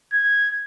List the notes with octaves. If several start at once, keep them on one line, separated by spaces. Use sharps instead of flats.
G#6